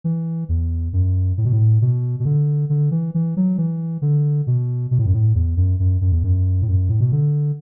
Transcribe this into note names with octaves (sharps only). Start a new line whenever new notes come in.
E3
E2
F#2
A2
B2
A2
B2
B2
D3
D3
E3
E3
F#3
E3
D3
B2
B2
A2
F#2
A2
E2
F#2
F#2
F#2
E2
F#2
A2
F#2
A2
B2
D3